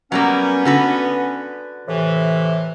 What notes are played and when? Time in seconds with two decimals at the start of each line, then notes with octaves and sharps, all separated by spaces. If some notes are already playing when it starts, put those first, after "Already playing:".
0.12 F#3 G3 A#3 B3 C#4
0.65 D3 F#4 B4
1.88 A2 C3 E3